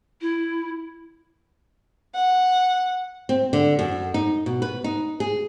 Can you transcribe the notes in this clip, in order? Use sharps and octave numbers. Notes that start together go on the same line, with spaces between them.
E4
F#5
C4
D3
F#2
D#4
B2
B4
D#4
G#4